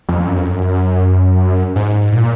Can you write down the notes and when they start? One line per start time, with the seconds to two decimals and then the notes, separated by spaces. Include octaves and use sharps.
0.08 F2
0.27 F#2
0.37 F2
0.50 F#2
1.76 G#2
2.12 A#2